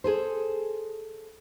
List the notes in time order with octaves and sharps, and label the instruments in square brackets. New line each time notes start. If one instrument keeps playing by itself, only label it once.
[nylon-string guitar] G#4 A4 C5